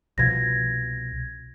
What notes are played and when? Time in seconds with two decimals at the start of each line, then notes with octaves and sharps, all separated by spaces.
0.18 C2 B2 F3 G#6 A#6